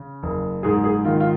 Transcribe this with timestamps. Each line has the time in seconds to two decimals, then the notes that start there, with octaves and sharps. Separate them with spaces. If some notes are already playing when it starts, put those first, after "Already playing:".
Already playing: C#3
0.23 F#1
0.63 G#2 G#4
0.84 G#4
1.05 D#3 F4
1.20 F4